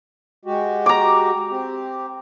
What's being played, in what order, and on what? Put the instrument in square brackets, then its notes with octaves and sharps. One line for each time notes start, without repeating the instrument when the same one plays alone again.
[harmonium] G#3 F#4 G4
[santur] A#5 D6
[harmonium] C4 G4